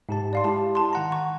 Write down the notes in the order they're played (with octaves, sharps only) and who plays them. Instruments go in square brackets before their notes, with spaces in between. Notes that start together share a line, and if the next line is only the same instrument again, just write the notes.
[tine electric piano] G#2 G4 A5
[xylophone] D5 F5 C6
[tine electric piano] G#3 E4 G4 [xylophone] A5
[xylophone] A5 C6
[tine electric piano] D#3 F#5 A#5
[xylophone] C#6